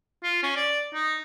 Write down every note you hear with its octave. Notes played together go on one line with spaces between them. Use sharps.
F4
C#4
D5
D#4